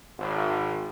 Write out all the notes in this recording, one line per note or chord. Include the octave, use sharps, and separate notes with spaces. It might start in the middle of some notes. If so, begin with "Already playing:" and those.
G#1